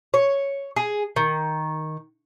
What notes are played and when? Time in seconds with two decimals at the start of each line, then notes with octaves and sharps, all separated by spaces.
0.14 C#5
0.76 G#4
1.16 D#3